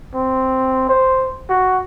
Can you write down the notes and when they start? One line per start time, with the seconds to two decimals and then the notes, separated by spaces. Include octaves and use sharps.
0.15 C4
0.89 C5
1.49 F#4